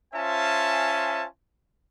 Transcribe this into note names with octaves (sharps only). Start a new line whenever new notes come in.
C#4 F4 C5 E5 G#5 A5